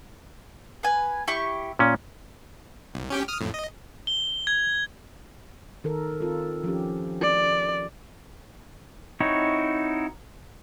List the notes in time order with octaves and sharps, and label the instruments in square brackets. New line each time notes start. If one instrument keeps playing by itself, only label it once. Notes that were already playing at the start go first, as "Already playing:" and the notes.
[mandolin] B4 G#5
E4 G4 C#6
[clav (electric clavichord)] A#2 C#4
[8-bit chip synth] C2
C#4 G4 G5
D#6 F6
F2 A2
D#5
[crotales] G7
G#6
[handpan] D#3 A4 A#4
C4 F4 A4
F3 C#4 G4
[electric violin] D5
[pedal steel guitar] C4 D#4 E4 F#4 C#5